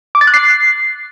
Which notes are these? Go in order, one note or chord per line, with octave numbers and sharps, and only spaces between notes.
D6
A6
F#6
C7